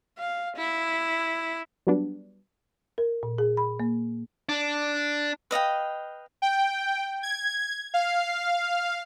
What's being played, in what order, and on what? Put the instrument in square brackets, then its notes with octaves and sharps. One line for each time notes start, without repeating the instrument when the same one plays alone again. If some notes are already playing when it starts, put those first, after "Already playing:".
[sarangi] F5
E4
[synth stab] F#3 G3 B3 D4
[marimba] A#4
A#2
G#4
B5
A#3
[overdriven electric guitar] D4
[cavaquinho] B4 D#5 F5 G5
[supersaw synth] G5
G#6
F5